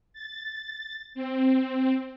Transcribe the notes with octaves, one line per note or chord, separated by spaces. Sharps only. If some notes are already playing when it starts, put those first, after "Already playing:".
A6
C4